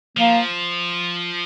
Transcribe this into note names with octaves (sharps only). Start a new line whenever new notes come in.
F3 A#3